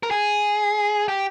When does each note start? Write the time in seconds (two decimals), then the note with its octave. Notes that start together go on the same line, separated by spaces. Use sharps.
0.03 A#4
0.11 G#4
1.08 G4